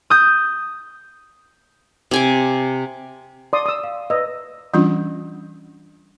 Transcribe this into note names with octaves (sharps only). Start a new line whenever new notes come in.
D#6 G6
C3 G#5 D6
D5 C6 D#6
D#6 E6
F5
B4 D5 D#5 E6
E3 G3 C#4 D4 F4